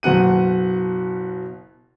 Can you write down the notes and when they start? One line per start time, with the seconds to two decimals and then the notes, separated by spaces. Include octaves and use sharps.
0.03 F#1 B2 F#5 D#7